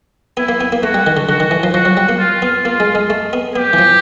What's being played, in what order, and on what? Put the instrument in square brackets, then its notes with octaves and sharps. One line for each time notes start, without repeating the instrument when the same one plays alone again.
[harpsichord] B3 [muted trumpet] E4
[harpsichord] A#3
B3
A#3
[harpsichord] A3 [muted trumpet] F#4
[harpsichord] G3
D#3
D3
[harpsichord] D3 [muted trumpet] F#4
[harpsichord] D#3
E3
F3
[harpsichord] F3 [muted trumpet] F#4
[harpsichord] F#3
G3
A#3
[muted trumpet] F4
[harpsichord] B3
[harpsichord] A#3 [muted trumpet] F4
[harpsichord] G#3
G#3
A3
B3
[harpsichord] B3 [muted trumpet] G4
[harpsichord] E3
F3